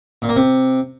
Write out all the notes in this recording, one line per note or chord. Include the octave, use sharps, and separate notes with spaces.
A#2
A#3
C3